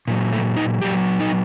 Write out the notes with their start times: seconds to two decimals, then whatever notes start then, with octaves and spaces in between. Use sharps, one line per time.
0.07 A#2 F#3
0.33 A3
0.56 D#4
0.82 A#2 F#3 G4
1.20 D#4